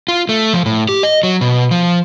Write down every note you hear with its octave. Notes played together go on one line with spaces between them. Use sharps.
F4
A3
F3
A2
G4
D#5
F#3
B2
F3